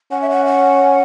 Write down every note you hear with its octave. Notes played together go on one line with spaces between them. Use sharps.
C#4 F#5
E5
F#5
F#5